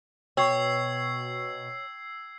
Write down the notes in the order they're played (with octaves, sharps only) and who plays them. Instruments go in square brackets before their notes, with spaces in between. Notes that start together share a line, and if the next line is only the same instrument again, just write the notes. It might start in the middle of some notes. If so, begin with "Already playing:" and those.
[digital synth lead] B2 [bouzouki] C#5 [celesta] G5 C#6 [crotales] E6 G#6 C7